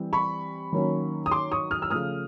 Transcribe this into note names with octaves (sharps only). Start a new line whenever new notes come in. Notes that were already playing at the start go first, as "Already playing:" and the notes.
Already playing: E3 G3 C4
B5 C#6
D#3 F#3 A#3 C#4
D#6
C6 D6
C#6 D#6
D#6 F6
E6
C#3 F3 A3 D#6 F6